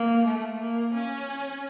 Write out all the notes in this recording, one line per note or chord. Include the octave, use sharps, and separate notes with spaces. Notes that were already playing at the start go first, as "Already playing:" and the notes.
Already playing: A#3
A3
A#3
C#4